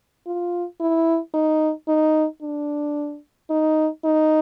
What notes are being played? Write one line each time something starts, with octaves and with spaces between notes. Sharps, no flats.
F4
E4
D#4
D#4
D4
D#4
D#4